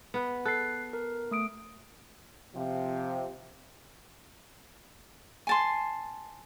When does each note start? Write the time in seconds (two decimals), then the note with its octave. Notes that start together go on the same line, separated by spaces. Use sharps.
0.14 B3 B4
0.46 A4 F#6 C7
0.93 A#4
1.31 A3 D#6 D7
2.54 C3 F3
5.47 G#5 A5 C6